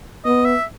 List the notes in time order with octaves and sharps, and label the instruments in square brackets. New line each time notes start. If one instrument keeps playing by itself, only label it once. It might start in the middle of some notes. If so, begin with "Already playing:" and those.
[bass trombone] B3 [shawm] D#5
[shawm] E5